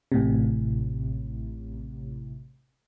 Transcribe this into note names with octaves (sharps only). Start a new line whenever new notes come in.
A1 A2 C3